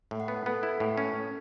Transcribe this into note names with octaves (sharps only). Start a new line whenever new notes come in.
A2
F#5
B3
B3 A4
E4
A2
C#4